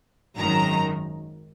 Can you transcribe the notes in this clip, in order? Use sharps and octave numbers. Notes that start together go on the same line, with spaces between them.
G#1 F#2 D#3 A#5